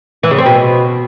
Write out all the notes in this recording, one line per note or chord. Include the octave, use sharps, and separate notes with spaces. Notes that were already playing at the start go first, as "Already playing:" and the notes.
E3
C#3
C4
B2